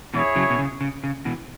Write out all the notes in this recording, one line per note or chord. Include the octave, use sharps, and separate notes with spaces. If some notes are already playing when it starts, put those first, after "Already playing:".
B2 E3 E4 G#4 C#5
C#3 F#3
B2
C#3
C#3
C#3
B2 E3